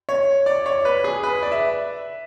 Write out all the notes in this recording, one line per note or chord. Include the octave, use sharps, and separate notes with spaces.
C#5
D5
C#5
B4
G#4
B4
D5
E5